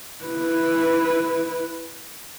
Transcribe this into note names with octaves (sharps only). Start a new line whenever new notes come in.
E4 B4